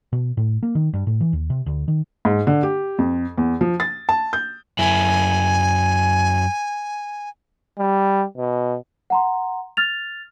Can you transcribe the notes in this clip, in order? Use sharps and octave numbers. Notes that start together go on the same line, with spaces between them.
B2
A2
A#3
D#3
G2
A2
E3
D#2
C3
D2
D#3
G#2
D3
G4
F2
E2
F3
A6
A5
G6
F#2 E4 G#5
G3
B2
F#5 A#5 C6
F6 A6 F7